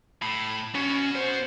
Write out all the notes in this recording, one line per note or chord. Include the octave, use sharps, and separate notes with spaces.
A2 B5
B3 C#4 F#4
C5